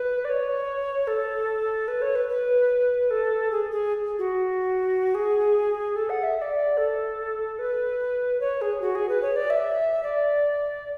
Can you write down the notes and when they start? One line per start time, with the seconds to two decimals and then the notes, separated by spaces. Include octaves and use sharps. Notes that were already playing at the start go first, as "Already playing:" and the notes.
Already playing: B4
0.25 D5
0.29 C#5
1.07 A4
1.88 B4
2.02 C#5
2.15 B4
2.29 B4
3.10 A4
3.51 G#4
3.71 G#4
4.19 F#4
5.15 G#4
5.96 A4
6.10 F#5
6.23 E5
6.37 E5
6.41 D5
6.77 A4
7.59 B4
8.40 C#5
8.61 G#4
8.81 F#4
8.95 G#4
9.09 B4
9.22 C#5
9.36 D5
9.50 E5
10.03 D5